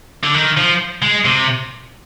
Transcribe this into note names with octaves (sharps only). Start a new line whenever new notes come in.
D3
D#3
F3
G#3
C3